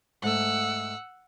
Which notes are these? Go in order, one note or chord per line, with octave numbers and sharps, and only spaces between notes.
G#2 A3 F#5 E6